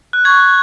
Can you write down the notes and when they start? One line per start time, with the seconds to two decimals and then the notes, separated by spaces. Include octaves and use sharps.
0.13 F#6
0.25 C#6 G#6